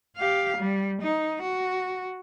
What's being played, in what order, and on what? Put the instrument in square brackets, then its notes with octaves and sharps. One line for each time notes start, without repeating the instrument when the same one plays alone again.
[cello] G4 F5
G3
D#4
F#4